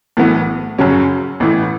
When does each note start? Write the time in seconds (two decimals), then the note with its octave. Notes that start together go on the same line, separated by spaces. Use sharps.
0.17 B1 A2 E3 B3
0.79 F#2 C#3 F#3 C#4
1.40 A1 A2 E3